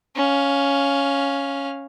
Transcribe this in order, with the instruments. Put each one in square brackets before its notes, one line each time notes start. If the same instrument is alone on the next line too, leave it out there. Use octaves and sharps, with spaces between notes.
[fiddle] C#4 F5